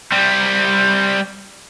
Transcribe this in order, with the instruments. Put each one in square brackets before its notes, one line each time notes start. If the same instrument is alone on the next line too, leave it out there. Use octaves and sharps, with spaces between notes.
[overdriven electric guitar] G3 C4